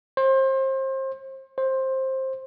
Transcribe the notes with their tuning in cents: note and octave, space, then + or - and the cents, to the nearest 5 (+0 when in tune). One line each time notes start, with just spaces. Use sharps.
C5 +30
C5 +15